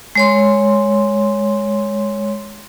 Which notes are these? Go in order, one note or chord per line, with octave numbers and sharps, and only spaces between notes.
G#3 C#5 C6